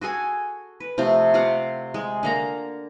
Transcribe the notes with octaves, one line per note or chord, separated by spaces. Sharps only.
F#4 G#4 A4 G#5
B4
C3 F3 A3
F4 G4 F5 F#5
G#3
D3 A#3 A#5